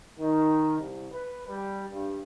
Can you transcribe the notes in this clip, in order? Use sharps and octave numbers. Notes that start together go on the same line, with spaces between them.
D#3
C2
B4
G3
G2